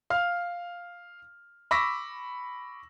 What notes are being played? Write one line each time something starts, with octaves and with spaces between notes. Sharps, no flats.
F5 F6
B5 C#6 D6 E6 A#6 B6